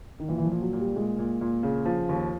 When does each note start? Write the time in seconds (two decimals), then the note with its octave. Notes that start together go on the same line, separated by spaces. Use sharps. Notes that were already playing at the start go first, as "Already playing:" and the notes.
0.20 D#3
0.28 A#2 E3
0.38 E3
0.46 F3
0.51 A#2
0.62 F#3
0.73 A#2
0.79 G3
0.96 A#2 G#3
1.18 A#2
1.41 A#2
1.63 C#3
1.85 F3
2.09 D#2